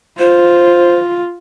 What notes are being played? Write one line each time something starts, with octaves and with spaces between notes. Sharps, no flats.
F4 C5